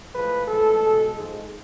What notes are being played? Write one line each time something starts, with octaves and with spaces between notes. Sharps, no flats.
A2 F3 G#3 B4
A2 F3 G#3 A4
B2 G#3
G#2 F3 G#3